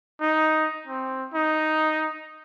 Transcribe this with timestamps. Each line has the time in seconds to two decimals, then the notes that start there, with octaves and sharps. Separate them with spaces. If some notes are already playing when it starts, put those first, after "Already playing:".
0.21 D#4
0.87 C4
1.34 D#4